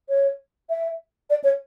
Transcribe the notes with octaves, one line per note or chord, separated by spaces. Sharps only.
C#5
E5
D5
C#5